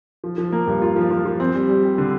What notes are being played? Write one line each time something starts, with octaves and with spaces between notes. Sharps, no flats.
F3
F3
A#3
G2
F4
F3
F3
F3
C4
G3
G3
G3
D3